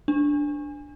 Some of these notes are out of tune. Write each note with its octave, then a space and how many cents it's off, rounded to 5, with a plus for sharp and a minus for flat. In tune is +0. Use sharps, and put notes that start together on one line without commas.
D4 +0